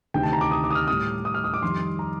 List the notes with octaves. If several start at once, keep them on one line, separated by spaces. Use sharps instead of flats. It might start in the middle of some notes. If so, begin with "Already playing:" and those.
D2 C3 D#3 G5
A5
A#5
D6
D#6
D6
D#6
F6
A2 G3 D#6
D#6
F6
D#6
D6
F2 D#3 G3 C6
A#5